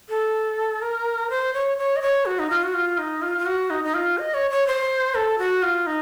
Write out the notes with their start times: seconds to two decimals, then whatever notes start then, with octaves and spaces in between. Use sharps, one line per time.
0.09 A4
0.82 A#4
1.30 C5
1.54 C#5
1.78 C#5
1.96 D#5
2.02 C#5
2.26 F#4
2.39 D#4
2.50 F4
2.64 F#4
2.74 F4
2.98 D#4
3.22 F4
3.38 F4
3.46 F#4
3.70 D#4
3.84 D#4
3.94 F4
4.18 D#5
4.34 C#5
4.50 C#5
4.67 C5
5.15 A4
5.38 F#4
5.63 F4
5.87 D#4